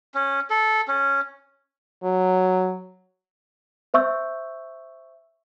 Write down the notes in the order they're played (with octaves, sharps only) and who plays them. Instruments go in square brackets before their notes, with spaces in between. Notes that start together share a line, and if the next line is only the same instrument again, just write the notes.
[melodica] C#4
A4
C#4
[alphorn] F#3
[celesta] C5 E5 C#6 E6 G6